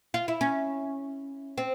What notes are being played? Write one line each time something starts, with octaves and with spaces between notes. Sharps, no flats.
F4
E4
C#4
C4